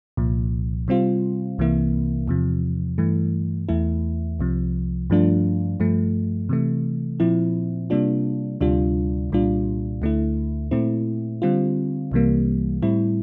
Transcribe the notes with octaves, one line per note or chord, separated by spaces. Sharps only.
C2 A#2 F3
C3 G3 C4 F4
C2 C3 E3 A#3 E4
E2 C3 F3
G2 E3 A3
E2 E3 A3 E4
C2 C3 F3
G2 F3 A3 D4 F4
G2 F3 A3
C3 E3 A3
A#2 F3 C4 E4
C3 G3 A#3 D4 F4
D2 C3 G3 D4 F4
C2 A#2 G3 D4 F4
D2 D3 A3 E4
A#2 A3 C4 E4
D3 G3 C4 F4
C2 C3 E3 G3 A#3
A2 G3 C4 E4